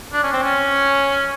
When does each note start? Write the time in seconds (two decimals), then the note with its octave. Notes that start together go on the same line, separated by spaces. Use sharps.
0.13 D4
0.23 C#4
0.33 C4
0.43 C#4